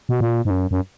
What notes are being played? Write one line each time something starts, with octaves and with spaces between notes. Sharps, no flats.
B2
A#2
G#2
F#2
F#2